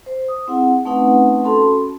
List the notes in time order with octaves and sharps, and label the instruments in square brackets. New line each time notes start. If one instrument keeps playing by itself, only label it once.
[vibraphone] C5
D#6
C4 E4 G#4 F#5
A3 C4 C#4 D#4 B4 F#5
C#4 F#4 A4 A5 B5 C6